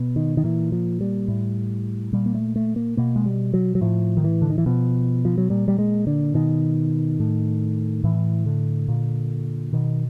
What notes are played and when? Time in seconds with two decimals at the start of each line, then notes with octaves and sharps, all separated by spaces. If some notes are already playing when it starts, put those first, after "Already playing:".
Already playing: B2
0.16 D#3
0.37 D#3
0.44 A#2 E3
0.72 F3
1.01 G3
1.28 A2
2.13 A#2 G3
2.26 A#3
2.35 A3
2.56 A3
2.76 A#3
2.97 B2 A#3
3.16 G#3
3.26 G3
3.54 F#3
3.75 F#3
3.81 A2 F3
4.17 D#3
4.24 E3
4.42 D3
4.50 D#3
4.58 E3
4.66 B2 F3
5.25 F3
5.38 F#3
5.50 A#2 G3
5.68 G3
5.79 G#3
6.07 D3
6.34 B2 D#3
7.20 A2
8.04 A2 E3
8.46 D3
8.88 A#2
9.73 B2 D#3